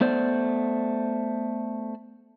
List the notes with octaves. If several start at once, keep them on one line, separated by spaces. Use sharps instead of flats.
A3 B3 C5 D5